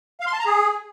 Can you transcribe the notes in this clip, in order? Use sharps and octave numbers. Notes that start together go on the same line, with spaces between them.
F5
C6
A5
A#5
G#4